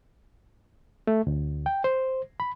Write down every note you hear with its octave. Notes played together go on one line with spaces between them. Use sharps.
A3
D2
G5
C5
B5